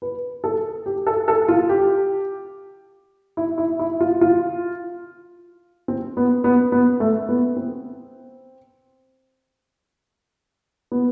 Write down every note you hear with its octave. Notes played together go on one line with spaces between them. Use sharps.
B4
A4
G4
A4
A4
F4
G4
E4
E4
E4
F4
F4
C4
B3
B3
B3
A3
B3
C4
B3